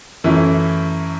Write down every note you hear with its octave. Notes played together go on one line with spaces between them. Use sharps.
F#2 E3 A3 C#4 E4